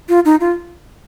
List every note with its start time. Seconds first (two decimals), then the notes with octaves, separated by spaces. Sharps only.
0.09 F4
0.25 D#4
0.40 F4